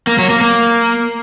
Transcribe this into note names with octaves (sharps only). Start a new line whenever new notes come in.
A#3
F#3
A#3
A#3